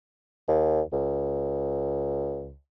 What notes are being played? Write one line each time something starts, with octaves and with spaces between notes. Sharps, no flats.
D#2
C#2